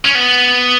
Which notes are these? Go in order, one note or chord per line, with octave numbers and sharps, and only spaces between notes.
C#4
B3